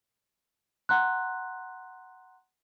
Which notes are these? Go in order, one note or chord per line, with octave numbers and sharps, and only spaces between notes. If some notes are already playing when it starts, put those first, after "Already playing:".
F#5 A#5 C6 F#6